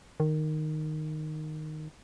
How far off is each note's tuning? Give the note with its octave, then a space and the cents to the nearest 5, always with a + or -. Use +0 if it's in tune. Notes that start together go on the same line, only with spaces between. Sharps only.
D#3 -10